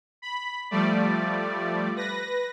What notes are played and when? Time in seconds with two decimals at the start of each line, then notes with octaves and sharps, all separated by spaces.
0.22 B5
0.71 F3 G3 A3 D5
1.96 B4 A#6